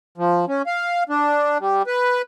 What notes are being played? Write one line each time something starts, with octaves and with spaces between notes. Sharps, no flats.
F3
C#4
F5
D4
G3
B4